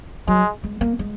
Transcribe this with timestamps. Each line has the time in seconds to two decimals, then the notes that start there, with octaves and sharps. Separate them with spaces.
0.27 F#3 G#3
0.64 G#3
0.81 A#3
0.99 G#3